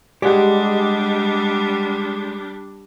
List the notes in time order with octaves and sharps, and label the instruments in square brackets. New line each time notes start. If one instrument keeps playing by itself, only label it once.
[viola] G3 D4 [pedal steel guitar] G#3 [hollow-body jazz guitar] G4 G#4 [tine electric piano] D5 F#5